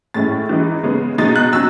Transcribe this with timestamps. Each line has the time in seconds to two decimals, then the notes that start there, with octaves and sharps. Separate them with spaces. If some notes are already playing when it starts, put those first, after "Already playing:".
0.14 A2 G#3 C#4 E4 A6
0.49 E3 G#3 D#4
0.83 C#3 G#3 B3
1.18 B2 G#3 D#4 A6
1.36 F#6
1.52 F#3 C#4 E6